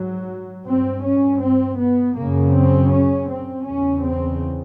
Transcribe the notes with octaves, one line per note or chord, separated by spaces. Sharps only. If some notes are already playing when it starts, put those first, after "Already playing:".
Already playing: G#2 F#3
G2 C4
C#4
C4
B3
F#2 C#3 A#3
C4
C#4
C4
E2 C#3 C#4
C4